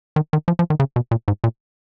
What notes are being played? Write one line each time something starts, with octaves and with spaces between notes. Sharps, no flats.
D#3
D#3
F3
F3
D#3
C#3
B2
A#2
G#2
A#2